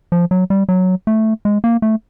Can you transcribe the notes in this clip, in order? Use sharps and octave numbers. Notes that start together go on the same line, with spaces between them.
F3
F#3
G3
F#3
A3
G#3
A#3
A3